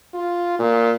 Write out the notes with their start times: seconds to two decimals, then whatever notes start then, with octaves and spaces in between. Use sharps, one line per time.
0.14 F4
0.59 A#2